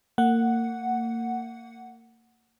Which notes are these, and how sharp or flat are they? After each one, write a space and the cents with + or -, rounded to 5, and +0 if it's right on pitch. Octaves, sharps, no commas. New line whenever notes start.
A#3 -30 F#5 +0